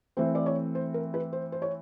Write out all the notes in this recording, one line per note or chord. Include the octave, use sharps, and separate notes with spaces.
E3 A3 C4 C5
D5
C#5
C5
A#4
B4
C5
C5
C#5